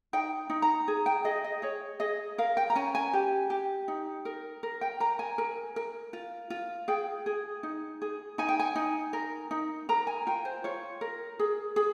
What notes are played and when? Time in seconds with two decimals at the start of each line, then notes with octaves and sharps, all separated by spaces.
0.13 D#4 G5
0.50 D#4
0.62 A#5
0.88 G#4
1.06 G5
1.25 G#4 D#5
1.44 D#5
1.62 G#4 C#5
2.00 G#4 D#5
2.38 A#4 F5
2.57 G5
2.70 A#5
2.75 C#4 G#5
2.95 G#5
3.14 G4
3.50 G4
3.88 D#4
4.25 A#4
4.63 A#4
4.81 G5
5.00 A#4 A#5
5.19 G#5
5.38 A#4
5.76 A#4
6.13 F4
6.50 F4
6.88 G#4 G5
7.26 G#4
7.63 D#4
8.02 G#4
8.38 D#4 G#5
8.49 G5
8.59 G#5
8.75 D#4
9.13 A#4
9.51 D#4
9.89 A#4 A#5
10.07 G#5
10.27 F4 G5
10.45 C5
10.64 F4 C#5
11.01 A#4
11.39 G#4
11.76 G#4